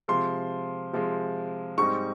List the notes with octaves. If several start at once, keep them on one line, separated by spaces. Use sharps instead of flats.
C3 F3 G#3 C6
C3 F3 G#3
G#2 G3 C4 D#4 C#6